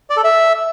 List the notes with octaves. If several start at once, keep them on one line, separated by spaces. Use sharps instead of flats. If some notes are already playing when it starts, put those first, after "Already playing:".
D5
A4
E5